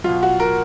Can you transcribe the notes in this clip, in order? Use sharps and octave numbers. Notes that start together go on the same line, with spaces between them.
B2 F#3 F4
F#4
A#4